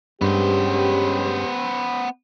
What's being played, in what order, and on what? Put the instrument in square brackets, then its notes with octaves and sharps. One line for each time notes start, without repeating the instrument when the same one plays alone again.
[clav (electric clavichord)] G2 [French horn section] G#3 C#4 G4 [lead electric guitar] B3 C5